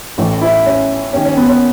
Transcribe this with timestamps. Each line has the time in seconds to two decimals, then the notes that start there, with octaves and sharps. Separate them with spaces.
0.18 A1 A2 E3
0.42 E4
0.66 C#4
1.13 D#2 D#3 C#4
1.25 C#4
1.37 B3
1.49 C#4